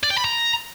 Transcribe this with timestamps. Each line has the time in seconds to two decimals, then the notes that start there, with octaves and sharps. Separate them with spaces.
0.03 D5
0.10 G5
0.17 B5
0.24 A#5